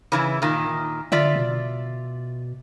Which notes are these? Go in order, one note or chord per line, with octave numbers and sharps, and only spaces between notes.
C#3 E3 E4
A#2 D#3
D3 F4 D5 E5
B2